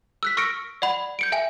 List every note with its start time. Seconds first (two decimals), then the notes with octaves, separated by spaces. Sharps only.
0.23 E6 F#6 B6
0.37 C#6 E6 F6 A#6 C#7 D7
0.82 D5 F#5 B5
1.19 G6 C#7 D7
1.32 E5 G5 G#5